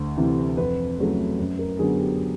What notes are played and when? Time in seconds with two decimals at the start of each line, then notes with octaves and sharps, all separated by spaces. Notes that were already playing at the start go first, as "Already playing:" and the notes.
Already playing: D2
0.17 C3 E3
0.57 F2 B4
0.98 C#3 F#3 A3
1.39 F#2
1.59 A#4
1.79 D3 F#3 B3 G#4
1.99 G4